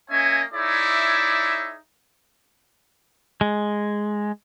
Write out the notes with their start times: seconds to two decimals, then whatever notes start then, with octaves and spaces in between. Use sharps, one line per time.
0.11 A#3 C#4 C#5 D#5 E5 G#5
0.53 D#4 E4 G#4 C#5 D5 E5
3.41 G#3